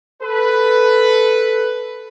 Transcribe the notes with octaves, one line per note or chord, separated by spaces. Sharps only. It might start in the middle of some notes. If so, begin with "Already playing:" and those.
A4 B4